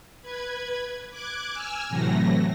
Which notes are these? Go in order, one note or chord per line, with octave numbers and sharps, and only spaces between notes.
B4 G#6
D6 F#6 G#6
G#5 E6 F6
A2 C3 E3 F#3 A3 A#6